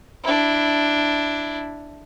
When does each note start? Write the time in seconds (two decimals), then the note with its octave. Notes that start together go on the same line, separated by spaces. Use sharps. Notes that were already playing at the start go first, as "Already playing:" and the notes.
0.23 D4 E4